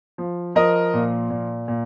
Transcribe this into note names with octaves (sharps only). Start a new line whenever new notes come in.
F3
F3 A#4 D#5
A#2
A#2
A#2